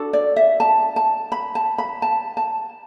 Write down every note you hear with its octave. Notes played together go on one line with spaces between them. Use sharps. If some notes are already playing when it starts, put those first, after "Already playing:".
Already playing: D4 F#4 A4
D5
E5
A5
A5
B5
A5
B5
A5
A5